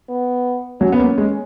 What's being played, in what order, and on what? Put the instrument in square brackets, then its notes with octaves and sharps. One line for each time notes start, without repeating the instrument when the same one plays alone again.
[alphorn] B3
[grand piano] F#3 [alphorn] C#4
[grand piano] B3
A#3
G#3